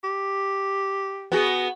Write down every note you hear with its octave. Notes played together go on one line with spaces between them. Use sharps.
G4
B3 F#4 G#4